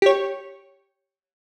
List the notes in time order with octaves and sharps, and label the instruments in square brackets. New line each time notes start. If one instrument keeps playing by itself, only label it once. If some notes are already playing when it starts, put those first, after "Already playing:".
[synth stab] G4 C#5